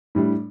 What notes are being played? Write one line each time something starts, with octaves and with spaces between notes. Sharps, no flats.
A2 G3 D4